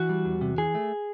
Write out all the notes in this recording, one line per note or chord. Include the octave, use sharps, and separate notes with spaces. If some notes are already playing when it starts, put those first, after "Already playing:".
Already playing: E3 F#4
G3
E2
C3
E3 G#4
A3